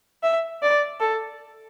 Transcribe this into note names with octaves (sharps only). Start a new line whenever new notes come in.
E5
D5
A4